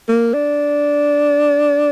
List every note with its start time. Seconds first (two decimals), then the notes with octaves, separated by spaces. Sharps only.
0.08 A#3
0.34 D4